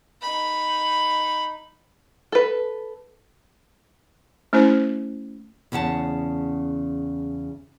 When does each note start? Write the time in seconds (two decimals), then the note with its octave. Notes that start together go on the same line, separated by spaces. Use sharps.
0.22 D#4 B5
2.32 A4 B4
4.53 A3 C#4 E4 C5
5.72 E2 C#3 C#4 F#5 A5